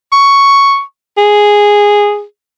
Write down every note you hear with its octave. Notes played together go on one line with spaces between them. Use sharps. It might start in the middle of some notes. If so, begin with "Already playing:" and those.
C#6
G#4